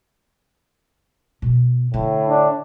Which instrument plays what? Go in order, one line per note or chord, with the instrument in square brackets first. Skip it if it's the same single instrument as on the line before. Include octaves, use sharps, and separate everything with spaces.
[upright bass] B2
[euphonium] A2 [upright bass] D3
[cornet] D4